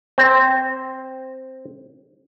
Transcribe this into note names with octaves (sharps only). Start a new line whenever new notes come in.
C4 C5